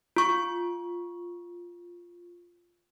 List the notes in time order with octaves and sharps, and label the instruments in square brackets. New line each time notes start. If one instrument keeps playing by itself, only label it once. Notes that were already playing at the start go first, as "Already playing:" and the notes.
[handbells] F4 C#6